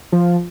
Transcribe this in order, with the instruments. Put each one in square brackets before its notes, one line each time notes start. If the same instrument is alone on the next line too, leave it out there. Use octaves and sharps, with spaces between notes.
[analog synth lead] F3